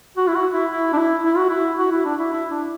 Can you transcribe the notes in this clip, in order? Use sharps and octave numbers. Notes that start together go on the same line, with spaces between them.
F#4
E4
F#4
E4
E4
D4
E4
E4
F#4
E4
F#4
E4
D4
E4
E4
D4